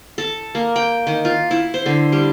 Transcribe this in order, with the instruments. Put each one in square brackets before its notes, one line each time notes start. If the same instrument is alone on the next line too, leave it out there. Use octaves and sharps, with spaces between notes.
[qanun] A4
A#3
G5
D#3
F4
E4
C5
D3
G3